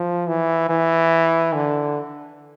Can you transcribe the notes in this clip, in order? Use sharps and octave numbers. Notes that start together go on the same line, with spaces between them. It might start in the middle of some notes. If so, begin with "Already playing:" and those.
Already playing: F3
E3
E3
D3